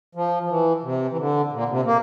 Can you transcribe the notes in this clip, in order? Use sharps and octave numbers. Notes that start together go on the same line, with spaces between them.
F3
F3
E3
C3
E3
D3
A#2
C3
A#3